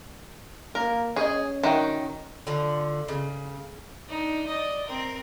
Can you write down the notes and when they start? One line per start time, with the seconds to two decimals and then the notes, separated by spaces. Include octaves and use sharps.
0.75 A#3 A#4
1.16 C#4 G#4 C#5 D#5
1.63 D#3 E4 F#4 G5
2.47 D3 F3
3.08 C#3
4.09 D4 D#4
4.46 D5 D#5
4.85 C4 A#4